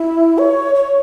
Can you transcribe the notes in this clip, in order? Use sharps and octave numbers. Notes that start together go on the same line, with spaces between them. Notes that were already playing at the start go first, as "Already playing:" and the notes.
Already playing: E4
C#5
C#5